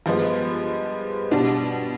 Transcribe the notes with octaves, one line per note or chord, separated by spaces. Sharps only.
G2 F3 G#3 B3
B2 G3 D4